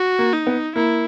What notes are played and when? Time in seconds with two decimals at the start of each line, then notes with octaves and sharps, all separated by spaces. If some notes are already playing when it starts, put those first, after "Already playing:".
Already playing: F#4
0.19 A#3
0.33 D#4
0.47 B3
0.76 A#3 E4